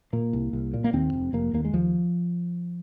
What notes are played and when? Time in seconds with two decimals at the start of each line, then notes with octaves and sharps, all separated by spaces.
0.13 A#2 A#3
0.33 C2
0.53 C2
0.74 A#2
0.84 A#3
0.93 D#2 C4
1.13 F1
1.33 F1 A#3
1.53 D#2 A#3
1.65 G#3
1.74 D#2 F3